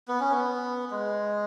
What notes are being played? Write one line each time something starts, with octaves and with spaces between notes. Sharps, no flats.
B3
C#4
B3
G#3